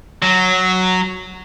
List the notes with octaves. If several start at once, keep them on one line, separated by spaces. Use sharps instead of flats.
F#3